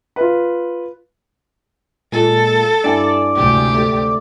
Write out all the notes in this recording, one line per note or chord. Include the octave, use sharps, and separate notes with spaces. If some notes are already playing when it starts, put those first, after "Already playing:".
F4 B4
A#2 G#3 A4
G2 E4 D5 G#5
D2 G#2 C3 G4
A3